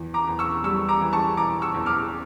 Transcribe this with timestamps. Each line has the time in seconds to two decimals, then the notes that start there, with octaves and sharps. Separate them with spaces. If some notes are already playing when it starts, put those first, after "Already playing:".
Already playing: E2
0.14 A#5 D6
0.27 E2
0.39 C#6 E6
0.64 G3 C#6 E6
0.88 A#5 D6
1.01 E3
1.13 A5 C#6
1.37 E3 A#5 D6
1.62 C#6 E6
1.74 E2
1.86 D6 F6